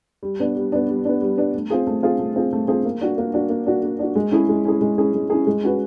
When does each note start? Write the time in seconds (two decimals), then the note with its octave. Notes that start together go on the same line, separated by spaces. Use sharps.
0.23 G3
0.40 B3 D4
0.56 G3
0.72 B3 D4
0.88 G3
1.05 B3 D4
1.22 G3
1.37 B3 D4
1.54 A3
1.70 C4 F4 G#4
1.87 A3
2.03 C4 F4 G#4
2.19 A3
2.36 C4 F4 G#4
2.53 A3
2.68 C4 F4 G#4
2.85 A#3
3.01 D4 F#4
3.18 A#3
3.34 D4 F#4
3.50 A#3
3.66 D4 F#4
3.83 A#3
3.99 D4 F#4
4.15 G#3
4.31 C#4 E4 G#4
4.49 G#3
4.65 C#4 E4 G#4
4.81 G#3
4.98 C#4 E4 G#4
5.14 G#3
5.30 C#4 E4 G#4
5.47 G#3
5.63 C#4 F#4 B4